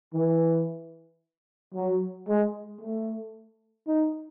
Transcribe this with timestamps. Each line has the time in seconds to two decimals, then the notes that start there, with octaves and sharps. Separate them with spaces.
0.14 E3
1.74 F#3
2.27 G#3
2.80 A3
3.87 D#4